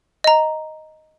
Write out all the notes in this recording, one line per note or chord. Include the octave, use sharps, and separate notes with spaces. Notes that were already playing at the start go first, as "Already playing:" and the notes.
D#5 A#5